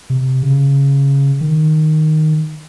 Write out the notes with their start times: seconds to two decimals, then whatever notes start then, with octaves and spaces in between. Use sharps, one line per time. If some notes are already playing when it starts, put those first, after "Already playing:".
0.10 C3
0.43 C#3
1.41 D#3